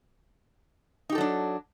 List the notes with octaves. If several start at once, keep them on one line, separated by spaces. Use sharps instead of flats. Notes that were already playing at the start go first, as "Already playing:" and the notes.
F#3 D4 D#4 G4 A4